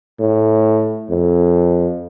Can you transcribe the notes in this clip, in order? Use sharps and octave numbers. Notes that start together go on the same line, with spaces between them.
A2
F2